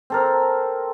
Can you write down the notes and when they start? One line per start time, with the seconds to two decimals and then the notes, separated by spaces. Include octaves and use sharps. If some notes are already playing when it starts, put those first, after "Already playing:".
0.10 C4 A4 A#4